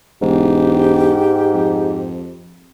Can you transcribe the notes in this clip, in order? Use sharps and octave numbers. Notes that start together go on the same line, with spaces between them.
E1 G#2 G4
F2